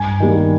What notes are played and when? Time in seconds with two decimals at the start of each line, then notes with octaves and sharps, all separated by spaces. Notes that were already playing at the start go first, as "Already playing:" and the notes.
Already playing: G2 G#5
0.20 D#3 G3 A#3